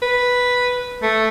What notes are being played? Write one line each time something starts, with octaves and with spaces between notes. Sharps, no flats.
B4
A3